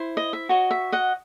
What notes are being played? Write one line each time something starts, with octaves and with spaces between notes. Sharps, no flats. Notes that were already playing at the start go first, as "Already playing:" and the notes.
Already playing: E4 C5
D#5
E5
F#4 C#5 D#5
E5
D#5 F#5